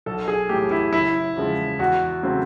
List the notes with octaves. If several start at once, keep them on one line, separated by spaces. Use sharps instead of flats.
B1 A4
G#4
A2 E3 A3 G4
E4
F#1 E4
E2 C#3 F3 G#3
E2 F#4
C#3 F#3 A3 C4